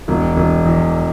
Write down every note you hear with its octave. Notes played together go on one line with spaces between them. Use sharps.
E1
E1
E2